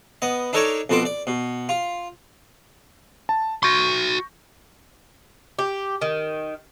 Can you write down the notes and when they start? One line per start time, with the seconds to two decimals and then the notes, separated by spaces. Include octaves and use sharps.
0.22 B3 D#5
0.53 D4 D#4 A4 A#4 C#5 D5
0.89 F2 B2 A4 A5 C6 D6
1.05 D5
1.27 B2
1.69 F4
3.29 A5
3.63 F#4 C6 C#6 G6 A#6
5.59 G4
6.01 D#3